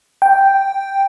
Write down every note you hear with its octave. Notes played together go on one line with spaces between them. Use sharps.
G5